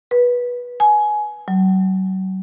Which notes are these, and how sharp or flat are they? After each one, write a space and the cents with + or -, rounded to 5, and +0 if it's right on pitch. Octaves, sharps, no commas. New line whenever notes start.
B4 -15
G#5 +20
F#3 +35